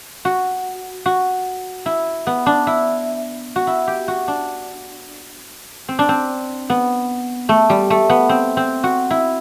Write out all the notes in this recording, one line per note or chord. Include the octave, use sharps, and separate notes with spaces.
F#4
F#4
E4
B3
D4
E4
F#4
E4
G4
F#4
D4
C4
D4
C4
B3
A3
G3
A3
B3
C4
C4
F#4
E4